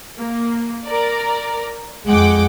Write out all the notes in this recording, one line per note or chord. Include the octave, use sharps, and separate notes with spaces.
A#3
A#4 D5
F2 G#3 F#5 G5 D6